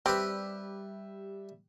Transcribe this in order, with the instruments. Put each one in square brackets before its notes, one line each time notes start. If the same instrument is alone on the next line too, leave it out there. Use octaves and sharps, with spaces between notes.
[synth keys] G3 E5 [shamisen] C4 [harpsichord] G4 B4